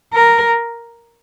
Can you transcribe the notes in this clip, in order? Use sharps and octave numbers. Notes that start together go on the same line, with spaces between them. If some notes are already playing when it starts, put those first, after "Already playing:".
A#4